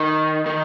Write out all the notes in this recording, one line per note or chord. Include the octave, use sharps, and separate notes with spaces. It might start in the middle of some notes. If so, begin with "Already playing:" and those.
Already playing: D#3
D#3